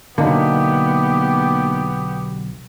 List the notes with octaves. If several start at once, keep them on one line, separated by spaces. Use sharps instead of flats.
B1 D3 A#3 B3 D#4 G4